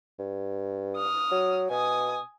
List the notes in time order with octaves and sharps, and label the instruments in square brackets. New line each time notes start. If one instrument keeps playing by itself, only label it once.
[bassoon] G2
[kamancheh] D#6 F6
[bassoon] F#3
[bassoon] B2 [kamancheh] G#5 D#6